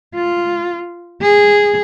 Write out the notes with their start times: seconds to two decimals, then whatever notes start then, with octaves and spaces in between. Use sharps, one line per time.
0.15 F4
1.22 G#4